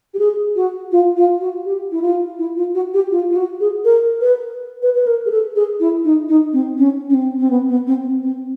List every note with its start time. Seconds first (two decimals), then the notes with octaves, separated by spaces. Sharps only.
0.14 G4
0.19 G#4
0.56 F#4
0.92 F4
1.16 F4
1.41 F#4
1.65 G4
1.92 E4
2.02 F4
2.39 E4
2.57 F4
2.75 F#4
2.94 G4
3.11 F4
3.30 F4
3.36 F#4
3.60 G#4
3.85 A#4
4.21 B4
4.82 B4
4.95 B4
5.07 A#4
5.26 G#4
5.31 A4
5.56 G#4
5.80 E4
6.04 D#4
6.29 D#4
6.53 C4
6.78 C#4
7.10 C#4
7.14 C4
7.38 C4
7.50 B3
7.69 B3
7.87 C4
8.23 C4